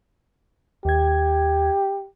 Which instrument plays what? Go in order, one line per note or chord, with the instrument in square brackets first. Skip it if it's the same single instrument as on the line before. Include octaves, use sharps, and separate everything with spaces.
[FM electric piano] D#2 G#6 [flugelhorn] G4